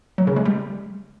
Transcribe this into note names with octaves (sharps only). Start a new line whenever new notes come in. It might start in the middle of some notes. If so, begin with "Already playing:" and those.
F#3
C#3
G#3
G3